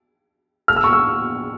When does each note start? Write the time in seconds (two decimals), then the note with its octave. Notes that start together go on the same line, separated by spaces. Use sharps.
0.68 F6
0.76 E6
0.84 C#6
0.93 E6